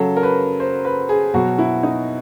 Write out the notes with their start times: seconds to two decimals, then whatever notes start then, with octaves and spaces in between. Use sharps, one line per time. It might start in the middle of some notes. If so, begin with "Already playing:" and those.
Already playing: C#3 F#3 A4
0.16 A#4
0.23 B4
0.60 C5
0.85 B4
1.09 G#4
1.34 B2 F#3 F#4
1.58 E4
1.83 D#4